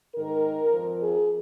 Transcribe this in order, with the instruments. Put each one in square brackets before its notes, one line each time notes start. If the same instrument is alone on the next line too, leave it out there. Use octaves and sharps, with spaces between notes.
[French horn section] G#2 D#3 A#4
F2 F3
G#4